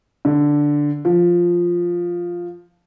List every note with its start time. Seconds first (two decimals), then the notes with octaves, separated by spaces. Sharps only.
0.25 D3
1.05 F3